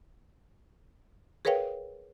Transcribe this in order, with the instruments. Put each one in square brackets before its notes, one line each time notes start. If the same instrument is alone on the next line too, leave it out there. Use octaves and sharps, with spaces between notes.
[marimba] G#4 A#4 B4 C#5 F5 G5